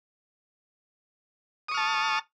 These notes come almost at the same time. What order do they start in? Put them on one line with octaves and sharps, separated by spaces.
D#6 C#6 F6 A5